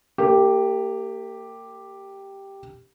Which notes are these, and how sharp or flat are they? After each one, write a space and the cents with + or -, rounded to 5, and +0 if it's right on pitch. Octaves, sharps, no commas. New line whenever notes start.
A#3 -35 G4 +0